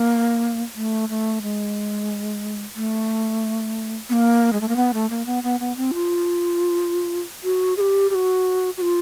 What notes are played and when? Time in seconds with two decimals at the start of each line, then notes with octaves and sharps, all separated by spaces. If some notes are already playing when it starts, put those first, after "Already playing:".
Already playing: A#3
0.75 A3
1.09 A3
1.42 G#3
2.76 A3
4.09 B3
4.13 A#3
4.53 G#3
4.61 A3
4.68 A#3
4.76 B3
4.94 A3
5.10 A#3
5.26 B3
5.43 B3
5.60 B3
5.77 C4
5.94 F4
7.44 F#4
7.77 G#4
7.81 G4
8.10 G4
8.15 F#4
8.77 F#4
8.82 F4